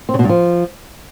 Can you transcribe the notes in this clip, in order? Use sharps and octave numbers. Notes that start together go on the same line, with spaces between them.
C4
C#3
B2
G2
F3